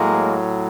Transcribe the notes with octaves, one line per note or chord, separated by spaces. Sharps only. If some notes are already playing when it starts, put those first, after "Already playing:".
Already playing: A2 F#3 G#3 A#3